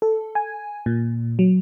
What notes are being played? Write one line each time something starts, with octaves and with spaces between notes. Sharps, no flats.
A4
G#5
A#2
F#3